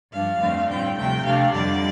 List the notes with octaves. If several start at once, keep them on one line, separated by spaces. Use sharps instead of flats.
G2 F3 D4 F5
F2 D3 A3 C4
A2 G3 C4 G5
D2 C3 F3 A3 C4 G5
C3 A3 D4 F5
F2 D3 G3 D5